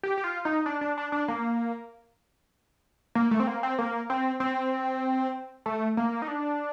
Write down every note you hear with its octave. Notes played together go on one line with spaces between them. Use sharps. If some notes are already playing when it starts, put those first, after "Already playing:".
G4
G4
F4
D#4
D4
D4
D4
D4
A#3
A#3
A3
C4
A#3
C4
A#3
C4
C4
A3
A#3
D#4
D4